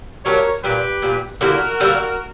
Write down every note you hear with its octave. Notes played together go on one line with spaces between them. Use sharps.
F#3 A#3 D4 G4 A#4 C#5
A#2 G3 A#3 G4 B4
A#2 G3 A#3
D3 G3 A#3 E4 F#4 A#4
D3 G3 A#3 E4